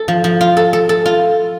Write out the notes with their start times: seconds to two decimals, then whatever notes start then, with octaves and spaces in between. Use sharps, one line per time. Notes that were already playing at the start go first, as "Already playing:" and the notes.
Already playing: A4
0.08 F3
0.24 F3
0.41 F4
0.57 A4
0.73 A4
0.89 A4
1.06 F4